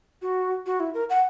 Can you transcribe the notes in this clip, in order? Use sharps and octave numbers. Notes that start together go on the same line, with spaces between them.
F#4
F#4
E4
A#4
F#5